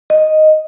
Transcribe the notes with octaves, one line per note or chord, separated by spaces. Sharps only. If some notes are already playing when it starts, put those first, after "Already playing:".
D#5